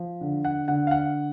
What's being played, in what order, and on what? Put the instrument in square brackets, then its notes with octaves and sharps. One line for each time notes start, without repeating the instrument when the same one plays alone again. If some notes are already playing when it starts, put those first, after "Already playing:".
Already playing: [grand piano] F3
D3
F#5
D3 F#5
F5
F#5